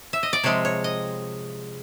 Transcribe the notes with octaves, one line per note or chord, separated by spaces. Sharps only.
E5
D#5
D5
C3 F3 G#3 C4 C#5
C#5
D#5